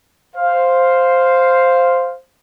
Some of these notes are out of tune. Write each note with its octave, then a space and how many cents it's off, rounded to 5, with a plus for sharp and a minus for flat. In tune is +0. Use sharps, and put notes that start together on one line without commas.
C5 +0 F5 +0